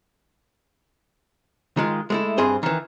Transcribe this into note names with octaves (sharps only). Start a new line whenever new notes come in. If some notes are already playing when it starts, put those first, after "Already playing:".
D#3 G#3 F4
G#3 A3 E4
G2 C4 G#4 C5
D#3 E3